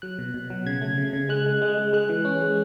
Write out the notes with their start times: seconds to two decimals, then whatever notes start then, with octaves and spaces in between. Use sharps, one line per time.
0.02 F#3 F#6
0.19 B2
0.34 B2
0.50 F#3
0.66 C#3 G#6
0.81 A3
0.98 C#3
1.13 C#3
1.29 G#3 F#6
1.46 G#3
1.62 G#3
1.78 G#3
1.93 G#3 F#6
2.09 E3
2.25 C#4
2.41 G#3